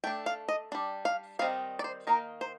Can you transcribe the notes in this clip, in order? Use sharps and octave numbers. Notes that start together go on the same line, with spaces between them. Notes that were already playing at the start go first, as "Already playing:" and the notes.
A3 D4 G5
F5
D#5
G3 D4
F5
D#3 G3 C4 D#4 F5
D5
C5
D#3 A#3 D#4 A#4
C5